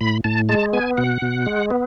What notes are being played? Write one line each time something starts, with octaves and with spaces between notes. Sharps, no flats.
A2 B5
A2 A5
G#3 A5
B3 G#5
B2 F#5
B2
G#3
B3